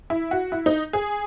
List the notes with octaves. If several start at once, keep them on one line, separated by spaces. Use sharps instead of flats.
E4
F#4
E4
D#4
G#4